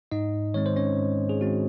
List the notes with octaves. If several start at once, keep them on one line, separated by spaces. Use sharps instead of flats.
G#2 D#4 D#5
D#3 G#3 C4 C#5
C5
C#4 C#5
G#2
G#4
D#3 G#3 C4 F#4